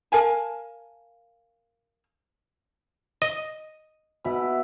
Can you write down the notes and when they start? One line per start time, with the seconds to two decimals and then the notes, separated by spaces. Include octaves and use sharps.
0.12 A#4 F5 G#5 A5
3.22 D#5
4.24 B2 E4 B5